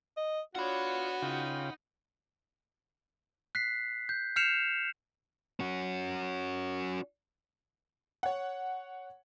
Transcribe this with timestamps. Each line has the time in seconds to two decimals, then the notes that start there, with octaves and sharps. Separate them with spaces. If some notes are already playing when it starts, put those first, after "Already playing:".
0.17 D#5
0.55 D4 F4 F#4 C#5 F#5 B5
1.22 C#3 D#4 F4 G5
3.55 F#6 B6 C7
4.09 G6
4.36 F6 G6 C7 C#7 E7 F7
5.60 C#4 F#4
8.23 C#5 F#5